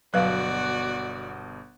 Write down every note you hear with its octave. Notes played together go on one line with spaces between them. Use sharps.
G1 B2 F#3 F#4 B4 D5 F5 F#6